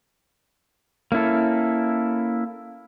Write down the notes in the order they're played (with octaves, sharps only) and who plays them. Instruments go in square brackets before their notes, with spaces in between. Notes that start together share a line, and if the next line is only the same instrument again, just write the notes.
[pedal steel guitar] A#3 C#4 E4 A4